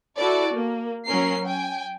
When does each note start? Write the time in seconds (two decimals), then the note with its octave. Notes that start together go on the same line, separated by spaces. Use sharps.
0.16 E4 F#4 A4 D5
0.53 A#3
1.06 F#3 C#4 A#4 C7
1.46 G5 G#5